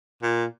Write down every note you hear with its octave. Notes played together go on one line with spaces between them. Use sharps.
A#2